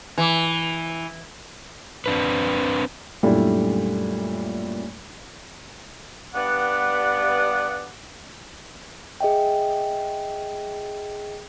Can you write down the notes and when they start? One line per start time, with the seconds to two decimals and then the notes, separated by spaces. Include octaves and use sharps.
0.18 E3
2.06 C4 D4 B4
3.23 F#2 A#2 G3 A3 D4 E4
6.35 G2 B3 D5 F#5
9.21 G#4 D#5 E5 G5